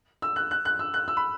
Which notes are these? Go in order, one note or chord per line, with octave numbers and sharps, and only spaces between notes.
E6
F#6
F#6
F#6
E6
F#6
E6
B5